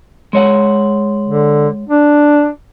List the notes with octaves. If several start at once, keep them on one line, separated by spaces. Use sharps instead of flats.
G#3 C#5 F#5
D3
D4